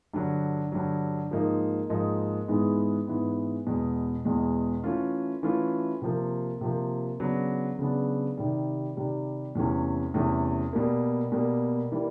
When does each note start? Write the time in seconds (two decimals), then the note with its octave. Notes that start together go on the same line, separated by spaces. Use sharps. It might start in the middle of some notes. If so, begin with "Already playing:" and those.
0.14 G2 D3 F#3
0.72 G2 D3 F#3
1.31 G#2 F3 A#3 D#4
1.90 G#2 F3 A#3 D#4
2.48 G#2 E3 G#3 B3
3.07 G#2 E3 G#3 B3
3.67 E2 B2 G#3
4.25 E2 B2 G#3
4.84 E3 A3 C#4 F4
5.43 E3 A3 C#4 F4
6.02 C3 F3 A#3
6.61 C3 F3 A#3
7.20 C#3 F#3 B3 D4
7.79 C#3 F#3 B3 D4
8.37 C3 D#3 G3
8.97 C3 D#3 G3
9.55 E2 C3 E3 A3 C#4
10.14 E2 C3 E3 A3 C#4
10.73 B2 G3 A#3
11.32 B2 G3 A#3
11.92 E3 G3 A#3